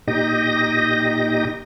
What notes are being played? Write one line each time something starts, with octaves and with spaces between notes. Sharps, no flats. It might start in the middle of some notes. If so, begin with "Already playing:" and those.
A#2 D#4 G4 D#5 A#6